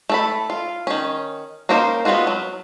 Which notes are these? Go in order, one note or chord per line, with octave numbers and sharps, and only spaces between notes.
A3 A4 B5
F4
D#3 C#4
A#3 C#4 D#4 A#4 C5
G#3 B3 C4 F4 F#4
F#3